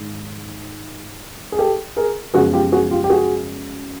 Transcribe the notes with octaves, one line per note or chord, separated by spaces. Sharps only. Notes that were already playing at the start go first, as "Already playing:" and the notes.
Already playing: G#2 D#3 G#3
G#4
G4 A4
G#4 A#4
F#2 C#3 F3 G#3 B3 F#4 G#4
F4 G4
F#4 G#4
F4 G4
G4
F#4 G#4